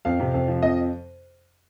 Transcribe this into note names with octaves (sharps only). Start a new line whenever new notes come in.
F2 F5
C3
F2
F3
F2 D#5